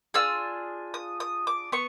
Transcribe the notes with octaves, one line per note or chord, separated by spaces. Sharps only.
D4 F4 G#4 E6
D#6
D#6
D6
B3 C#6